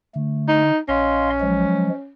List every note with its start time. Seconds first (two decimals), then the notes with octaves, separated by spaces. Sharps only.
0.16 D3 A3
0.48 D#4
0.89 A#1 C#4 D#5 F5 C6
1.41 F3 F#3 G#3